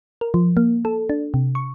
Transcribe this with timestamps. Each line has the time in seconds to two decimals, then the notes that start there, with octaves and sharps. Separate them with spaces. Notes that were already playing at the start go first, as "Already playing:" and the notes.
0.21 A#4
0.34 F3
0.57 A#3
0.85 A4
1.09 D4
1.34 C3
1.55 C#6